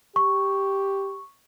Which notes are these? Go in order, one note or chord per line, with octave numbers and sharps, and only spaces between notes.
G4 C#6